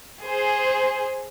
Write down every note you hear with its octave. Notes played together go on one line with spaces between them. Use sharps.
G#4 C5